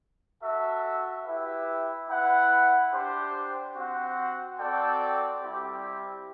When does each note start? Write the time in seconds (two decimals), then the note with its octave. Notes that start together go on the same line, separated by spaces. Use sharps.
0.41 F#4 A4 E5
1.25 E4 G4 B4 E5
2.09 E4 B4 F#5
2.92 D4 G4 C5
3.75 C4 F#4 C5 F#5
4.59 C4 F#4 A4 D5 G5
5.42 G3 C4 E4 G4